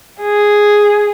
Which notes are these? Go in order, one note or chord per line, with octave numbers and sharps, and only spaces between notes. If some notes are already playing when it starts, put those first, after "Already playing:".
G#4